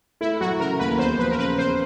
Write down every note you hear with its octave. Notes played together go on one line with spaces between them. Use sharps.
A3 E4
F#3 F#4
C#3 A#4
D#2 B4
E2 C5
F3 B4
A#4
C#3 B4
E2 C5